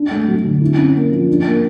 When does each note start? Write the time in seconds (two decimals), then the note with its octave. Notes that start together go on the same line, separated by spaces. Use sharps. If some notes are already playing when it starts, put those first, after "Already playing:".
Already playing: D4
0.11 A3
0.28 F#3
0.44 D3
0.61 E4
0.78 C#4
0.95 A#3
1.12 F3
1.28 D4
1.46 A#3